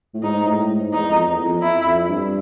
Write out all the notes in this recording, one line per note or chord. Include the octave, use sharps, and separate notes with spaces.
A2
G#2 D#4
A2
G#2
E2 D#4
F2
E2
F2
E4
F2
G2